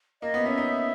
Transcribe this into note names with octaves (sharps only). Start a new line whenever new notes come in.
A#3 D#5
B3
C#4 E5
D#4